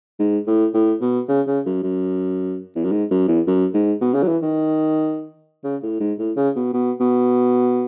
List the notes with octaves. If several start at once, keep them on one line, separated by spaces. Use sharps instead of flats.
G#2
A2
A2
B2
C#3
C#3
F#2
F#2
E2
F#2
G#2
F#2
E2
F#2
G#2
B2
C#3
F#3
E3
D#3
C#3
A2
G#2
A2
C#3
B2
B2
B2